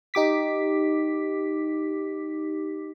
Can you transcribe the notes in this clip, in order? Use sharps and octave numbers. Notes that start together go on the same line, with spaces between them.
D#4 G4 D6 B6